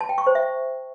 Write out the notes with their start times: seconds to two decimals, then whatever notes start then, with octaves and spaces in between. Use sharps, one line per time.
0.01 A5
0.09 G5
0.18 C#6
0.27 C5
0.35 E5